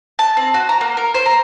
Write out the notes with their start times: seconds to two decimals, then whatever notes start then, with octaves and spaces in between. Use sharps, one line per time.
0.19 A5
0.37 C4
0.54 F#4
0.69 A#5
0.81 A#3
0.97 A#4
1.14 C5
1.26 A#5